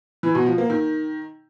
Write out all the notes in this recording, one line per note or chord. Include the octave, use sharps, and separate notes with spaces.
E3
B2
F3
A#3
D#3